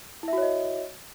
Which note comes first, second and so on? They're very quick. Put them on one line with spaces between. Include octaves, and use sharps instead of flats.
E4 E5 F#4 C#5 D#5